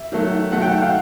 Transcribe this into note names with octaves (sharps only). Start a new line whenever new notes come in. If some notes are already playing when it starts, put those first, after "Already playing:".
Already playing: E5
D#3 F#3 A3
D#3 F#3 A3 F#5
G5
F#5
F5